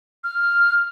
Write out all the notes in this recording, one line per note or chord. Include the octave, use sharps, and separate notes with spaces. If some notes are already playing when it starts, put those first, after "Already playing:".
F6